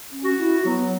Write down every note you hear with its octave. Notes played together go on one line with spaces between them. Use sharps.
C#4
F#4
E4
F#3 B3